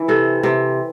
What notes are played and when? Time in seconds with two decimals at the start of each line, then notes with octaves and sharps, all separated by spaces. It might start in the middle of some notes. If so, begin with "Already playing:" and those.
Already playing: E3
0.08 C3 A4
0.43 C3